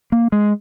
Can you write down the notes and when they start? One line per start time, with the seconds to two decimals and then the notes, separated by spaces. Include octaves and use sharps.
0.12 A#3
0.32 G#3